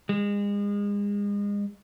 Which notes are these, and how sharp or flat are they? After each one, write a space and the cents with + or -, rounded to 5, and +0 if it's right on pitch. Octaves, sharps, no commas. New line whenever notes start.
G#3 -35